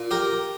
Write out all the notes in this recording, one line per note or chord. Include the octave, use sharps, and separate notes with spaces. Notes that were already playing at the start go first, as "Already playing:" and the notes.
Already playing: A#2
G4 A#4